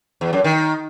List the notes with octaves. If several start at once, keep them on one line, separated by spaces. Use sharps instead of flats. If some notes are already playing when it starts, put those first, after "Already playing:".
E2
F#2
D#3